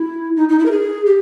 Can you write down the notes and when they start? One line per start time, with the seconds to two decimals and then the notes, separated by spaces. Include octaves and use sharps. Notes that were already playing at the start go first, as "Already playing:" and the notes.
Already playing: E4
0.36 D#4
0.49 D#4
0.59 E4
0.66 A#4
0.71 G#4
1.06 G4